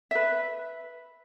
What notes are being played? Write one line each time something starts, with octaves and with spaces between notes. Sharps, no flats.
B4 E5